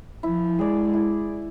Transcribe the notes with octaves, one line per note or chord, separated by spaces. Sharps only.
F3 E4
G#3 G#4 D5
E4